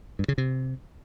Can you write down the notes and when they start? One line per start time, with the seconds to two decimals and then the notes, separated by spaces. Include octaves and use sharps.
0.19 G2
0.28 C#3
0.38 C3